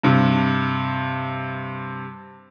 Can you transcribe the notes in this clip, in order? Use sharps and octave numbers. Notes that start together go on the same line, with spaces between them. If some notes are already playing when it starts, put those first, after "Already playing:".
G2 C3